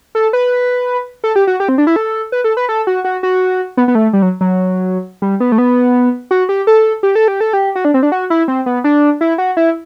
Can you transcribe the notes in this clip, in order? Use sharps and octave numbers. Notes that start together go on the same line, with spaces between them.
A4
B4
A4
G4
F#4
G4
C4
D4
E4
A4
B4
A4
B4
A4
F#4
F#4
F#4
B3
B3
A3
G3
F#3
F#3
G3
B3
A3
B3
F#4
G4
A4
G4
A4
G4
A4
G4
F#4
D4
C4
D4
F#4
E4
C4
B3
D4
E4
F#4
E4